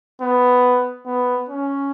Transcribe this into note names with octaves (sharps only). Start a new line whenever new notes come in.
B3
B3
C#4